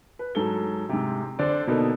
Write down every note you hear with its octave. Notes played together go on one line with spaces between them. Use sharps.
B4
G#2 F#3 A4 G7
G#2 C3
D3 D4 C5 D5
B2 A#3 B3 D#4 A4